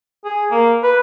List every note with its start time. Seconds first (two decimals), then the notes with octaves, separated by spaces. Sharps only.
0.25 G#4
0.51 A#3
0.83 B4